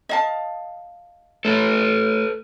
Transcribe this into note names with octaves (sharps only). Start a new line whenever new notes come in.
D#5 F5 A5
A3 A4 B4